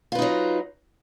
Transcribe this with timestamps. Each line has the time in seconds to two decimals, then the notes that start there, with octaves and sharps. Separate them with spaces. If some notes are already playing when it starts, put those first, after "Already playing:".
0.12 F4
0.15 B4
0.19 D#4
0.22 F#3